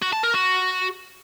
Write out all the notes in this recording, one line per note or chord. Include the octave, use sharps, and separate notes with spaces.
F#4
A5
A#4
F#4